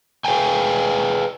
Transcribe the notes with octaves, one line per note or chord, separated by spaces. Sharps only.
G#4 B4 C#5 F5 G5 G#5